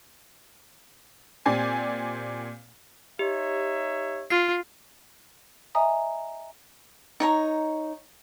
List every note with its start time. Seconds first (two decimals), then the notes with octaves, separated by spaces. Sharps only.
1.45 A#2 C4 G4 D5 G#5 C7
3.19 D#4 G4 C#5 E5
4.30 F4 C7
5.75 D#5 E5 G#5 A#5 D#6
7.20 D#4 C#5 A#5